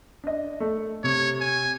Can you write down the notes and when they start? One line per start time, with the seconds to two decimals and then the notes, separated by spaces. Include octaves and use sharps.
0.24 D4 D#5
0.60 A3
1.04 C3 C#5
1.41 G#5